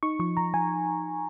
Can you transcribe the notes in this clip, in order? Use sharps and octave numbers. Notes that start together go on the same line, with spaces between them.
D#4 C#6
F3 C#6
F3 A#5
F3 G#5